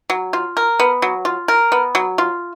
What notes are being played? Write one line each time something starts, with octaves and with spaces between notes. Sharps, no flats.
F#3
F4
A#4
B3
F#3
F4
A#4
B3
F#3
F4